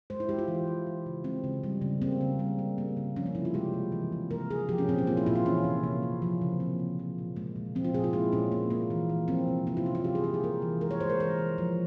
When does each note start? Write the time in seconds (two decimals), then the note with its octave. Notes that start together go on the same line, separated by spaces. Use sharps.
0.10 G#3 C5
0.20 E4
0.29 G#3 G4
0.39 F4
0.48 E3
0.67 E3
0.87 E3
1.06 C#3
1.24 G#3 C4
1.44 C#3
1.64 G3
1.81 C#3
2.02 A#3 C4
2.21 C#3
2.39 G3
2.59 C#3
2.78 A#3
2.97 C#3
3.16 F3 C#4
3.26 A#3
3.35 C3 E4
3.45 F4
3.54 G#3 G4
3.73 C3
3.92 E3
4.12 C3
4.31 A#3 A#4
4.50 C3 G#4
4.69 F3 G4
4.78 C#4
4.88 A#2 C4
4.98 C#4
5.07 A#3 F4
5.17 E4
5.26 A#2 F4
5.36 E4
5.46 E3 C#4
5.64 C3
5.83 A#3
6.03 C3
6.22 F3
6.42 C#3
6.60 A#3 C4
6.79 C#3
6.99 F3
7.18 A#2
7.36 G#3 A#3
7.56 A#2
7.75 F3 C4
7.84 F4
7.94 A#2 G#4
8.04 F4
8.13 G#3 E4
8.32 A#2 C#4
8.52 A#3
8.70 A#3
8.90 E3
9.09 E3
9.28 F3 C4
9.47 C3
9.67 A#3 E4
9.77 F4
9.85 C3 C#4
9.95 F4
10.04 G3 G4
10.15 G#4
10.24 E3 G4
10.34 G#4
10.44 A#3 A#4
10.62 E3
10.81 G#3 A#4
10.91 C#5
11.00 G#3 C5
11.10 A#4
11.20 E3 A#4
11.38 E3
11.58 F3